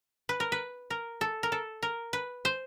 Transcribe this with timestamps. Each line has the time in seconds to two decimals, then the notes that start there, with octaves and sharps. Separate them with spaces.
0.29 B4
0.40 A#4
0.52 B4
0.90 A#4
1.21 A4
1.43 A#4
1.52 A4
1.83 A#4
2.13 B4
2.45 C5